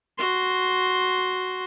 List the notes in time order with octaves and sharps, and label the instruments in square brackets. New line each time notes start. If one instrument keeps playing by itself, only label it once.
[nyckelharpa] F#4 C6